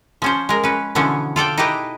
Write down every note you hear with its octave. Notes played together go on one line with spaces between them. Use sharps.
F3 C#4 C5
G#3 A#4
C#4 B4
B2 D3 E3 F3 B3 C#4
F4 A4 D5 G5
D#4 E4 G4 B4 D#5